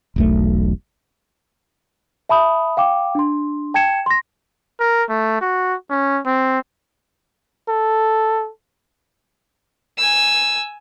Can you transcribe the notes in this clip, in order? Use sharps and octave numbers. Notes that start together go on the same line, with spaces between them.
E1 B1 A3
E5 A5 B5 D#6
F5 G5 D6
D4 C6
G5 A5 G#6 C#7 E7
C6 A#6
A#4
A3
F#4
C#4
C4
A4
G#5 E6